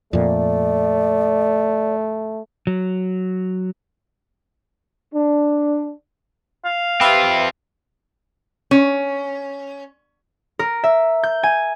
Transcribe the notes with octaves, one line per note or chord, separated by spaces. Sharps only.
F2 A#2 A3 D5
F#3
D4
F5
C4 F4 G4 B4 E5
C#4
A#4
E5
G6
G#5